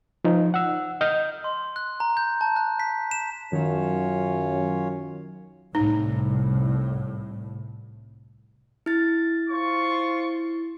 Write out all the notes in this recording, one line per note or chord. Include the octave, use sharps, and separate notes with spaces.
F3 D#4
F#5 E6
D#5 F6 G6
C6
F#6
A#5
G6
A5
F#6
B6
E7
F#2 D#3 F#3 C#4 F4 C#5
C2 A2 D#4
E4 A6
F4 C5 C#6